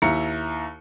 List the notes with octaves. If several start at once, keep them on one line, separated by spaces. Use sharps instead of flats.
D#2 E4 A#5 C#7